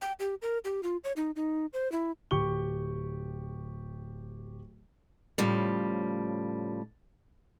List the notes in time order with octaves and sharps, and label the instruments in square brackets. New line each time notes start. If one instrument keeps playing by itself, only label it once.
[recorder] G5
G4
A#4
G4
F4
C#5
D#4
D#4
C5
E4
[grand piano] D1 G4 C#6 G7
[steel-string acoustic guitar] A2 C#3 F3 G3